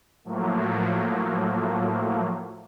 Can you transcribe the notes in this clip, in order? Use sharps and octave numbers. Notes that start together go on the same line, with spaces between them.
A2 F3 F#3 A3 A#3